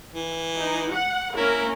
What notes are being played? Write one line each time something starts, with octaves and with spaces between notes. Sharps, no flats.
E3
D#4
F#5
A#3 C#4 E4 A#4